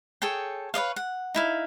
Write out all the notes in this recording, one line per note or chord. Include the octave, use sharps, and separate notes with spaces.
G#4 A4 C#5 G5
B4 C#5 D#5 F5
F#5
D#4 E4 F5